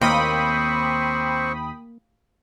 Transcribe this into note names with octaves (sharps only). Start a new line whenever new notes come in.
D#2 A#3 C4 C5 G5 B5 C#6 D#6